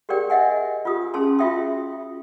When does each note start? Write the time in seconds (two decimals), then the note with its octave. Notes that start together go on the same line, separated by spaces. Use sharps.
0.09 G4 G#4 A#4 D5 G5
0.30 D#5 E5 F#5 G#5
0.85 F4 G4 D#6
1.14 C#4 G#4 A5 C6
1.39 F4 F#4 E5 G5 D#6